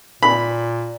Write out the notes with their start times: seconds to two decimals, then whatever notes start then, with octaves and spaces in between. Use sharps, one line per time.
0.23 A#2 B5